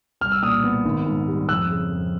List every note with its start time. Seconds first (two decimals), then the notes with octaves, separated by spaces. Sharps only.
0.21 C2 F6
0.32 E6
0.42 A#2 D#6 F6
0.64 B3
0.85 G#1
1.06 G#2
1.28 G3
1.49 F2 E6 F#6
1.70 C#3
1.91 F2